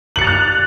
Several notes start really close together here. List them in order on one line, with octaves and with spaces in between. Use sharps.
F#7 C#7 A6 F7 F#6